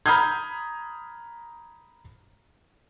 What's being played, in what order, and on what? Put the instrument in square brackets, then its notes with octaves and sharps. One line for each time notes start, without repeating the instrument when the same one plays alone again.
[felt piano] A#5 B5 D#6 F6 G6 G#6